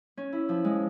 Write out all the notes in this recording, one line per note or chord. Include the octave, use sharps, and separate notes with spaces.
C#4
E4
F3
G#3